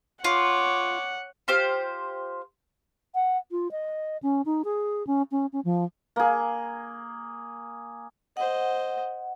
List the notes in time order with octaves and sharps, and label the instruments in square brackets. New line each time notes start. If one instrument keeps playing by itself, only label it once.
[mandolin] F4 [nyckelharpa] C#5 D6 [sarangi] F#5
[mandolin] F4 G4 C5 F6
[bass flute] F#5
F4
D#5
C#4
D#4
G#4
C#4
C#4
C#4
F3
[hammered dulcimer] A#3 G#4
[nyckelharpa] C5 D#5 [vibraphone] F#5